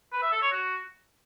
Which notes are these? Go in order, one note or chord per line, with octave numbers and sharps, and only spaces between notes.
B4
E5
A4
C#5
F#4